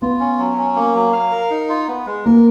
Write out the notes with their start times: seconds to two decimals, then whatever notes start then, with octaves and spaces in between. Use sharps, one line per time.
0.02 B3 F4
0.20 C#4
0.39 F#3
0.58 C#4
0.76 A#3
0.95 F#3
1.13 F5
1.32 A#4
1.50 D#4
1.69 F4
1.88 B3
2.07 G#3
2.25 A#3 A#4